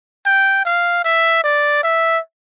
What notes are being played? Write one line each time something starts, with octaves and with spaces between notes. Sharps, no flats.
G5
F5
E5
D5
E5